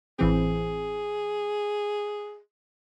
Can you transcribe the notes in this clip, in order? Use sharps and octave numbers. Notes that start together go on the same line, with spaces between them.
A1 E3 C4 G#4